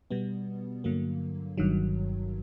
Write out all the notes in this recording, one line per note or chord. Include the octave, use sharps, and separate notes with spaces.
B2 G3 B3
G2 D3 F#3 A#3
G1 G2 D#3 F#3